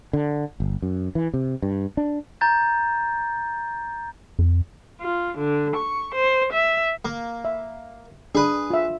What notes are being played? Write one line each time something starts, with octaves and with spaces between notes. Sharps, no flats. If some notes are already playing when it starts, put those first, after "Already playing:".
D3
G1
F#2
E3
C3
G2
D4
A#5 G6 A6
F2
F4
D3
C#6
C5
E5
A#3
E5
D4 G#4 B4
F4 E5